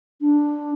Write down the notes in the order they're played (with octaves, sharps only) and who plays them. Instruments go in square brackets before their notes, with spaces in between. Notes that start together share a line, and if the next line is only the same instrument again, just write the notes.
[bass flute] D4